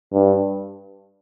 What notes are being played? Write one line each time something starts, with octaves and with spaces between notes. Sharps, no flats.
G2